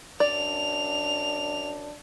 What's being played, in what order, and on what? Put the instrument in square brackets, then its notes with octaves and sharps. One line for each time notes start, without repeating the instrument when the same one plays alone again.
[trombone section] F#2 D4 [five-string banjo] D5 [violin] F7